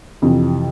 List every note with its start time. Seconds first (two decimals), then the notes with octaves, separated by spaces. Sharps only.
0.22 F2 C3 E3